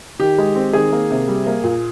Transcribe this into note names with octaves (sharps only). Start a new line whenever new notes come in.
D#3 G4
G#3
C4
D#3 G#4
A#3
C3
G3
A#3
A#2